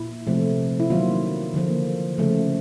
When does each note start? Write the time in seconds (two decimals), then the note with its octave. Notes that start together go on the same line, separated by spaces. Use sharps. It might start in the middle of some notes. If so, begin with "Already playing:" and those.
Already playing: A#2 E4
0.27 C3 F3 A3
0.80 E4
0.90 D#3 F#3 A#3 F4
1.54 D3 F3 A#3
2.18 C#3 F3 A3